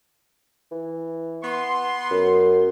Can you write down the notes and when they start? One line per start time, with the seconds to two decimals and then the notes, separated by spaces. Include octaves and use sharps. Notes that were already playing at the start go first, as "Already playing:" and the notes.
0.72 E3
1.44 B3 C6
2.11 F#2